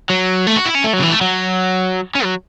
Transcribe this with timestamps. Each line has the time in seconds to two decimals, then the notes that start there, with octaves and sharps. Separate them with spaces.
0.09 F#3
0.47 A3
0.56 F#4
0.66 E4
0.75 C#4
0.84 A3
0.93 F#3
0.99 C#3
1.03 E3
1.08 F#3
1.12 A3
1.21 F#3
2.15 C#4
2.24 F#3